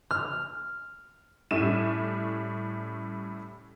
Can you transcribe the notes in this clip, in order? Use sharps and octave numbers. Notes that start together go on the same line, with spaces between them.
F6
A2 G3 C#4 E5 D#7 E7